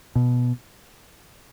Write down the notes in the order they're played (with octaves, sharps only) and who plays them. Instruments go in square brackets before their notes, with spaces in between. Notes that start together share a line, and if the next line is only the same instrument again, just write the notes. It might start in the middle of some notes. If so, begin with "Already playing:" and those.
[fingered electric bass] B2